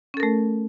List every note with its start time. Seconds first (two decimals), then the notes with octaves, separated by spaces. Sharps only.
0.14 C#4
0.17 A4
0.20 A#4
0.23 A3